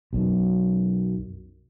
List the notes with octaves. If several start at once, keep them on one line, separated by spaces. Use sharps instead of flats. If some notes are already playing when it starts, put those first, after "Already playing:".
B1 F#2